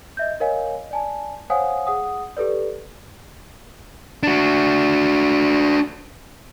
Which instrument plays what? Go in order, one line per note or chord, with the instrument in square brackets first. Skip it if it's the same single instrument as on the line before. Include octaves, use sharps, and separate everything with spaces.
[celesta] D#5 E5 G6
A#4 C#5 D#5 F5 G#5
D5 G#5 A5
C5 C#5 F5 F#5 G#5 D#6
G#4 F#5 D#6
G4 A4 B4 D5
[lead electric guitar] D4 F#4